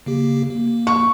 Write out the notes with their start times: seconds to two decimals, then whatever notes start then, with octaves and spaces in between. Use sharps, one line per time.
0.06 C#3 A#3 G4
0.50 A#3
0.87 C#6